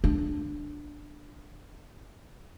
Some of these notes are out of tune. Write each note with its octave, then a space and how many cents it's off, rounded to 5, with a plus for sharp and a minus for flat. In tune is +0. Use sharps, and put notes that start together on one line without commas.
D4 +5